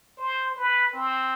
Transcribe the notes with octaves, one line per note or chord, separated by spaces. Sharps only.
C5
B4
C4